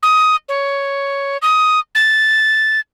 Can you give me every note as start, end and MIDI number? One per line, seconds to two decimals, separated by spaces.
0.03 0.36 87
0.49 1.37 73
1.42 1.79 87
1.95 2.80 93